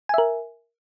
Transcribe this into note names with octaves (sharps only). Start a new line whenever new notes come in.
A#4 E5 G#5